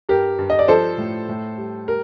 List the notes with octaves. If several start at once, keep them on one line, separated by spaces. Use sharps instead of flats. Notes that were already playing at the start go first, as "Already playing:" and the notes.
G2 G4 A#4
G2
D#5
D5
F3 A4 C5
A2
A2
G3
G3 A#4